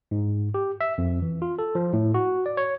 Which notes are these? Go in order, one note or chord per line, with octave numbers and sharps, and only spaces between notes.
G#2
G4
E5
F2
E3
F4
A4
F3
A2
F#4
D5
C#5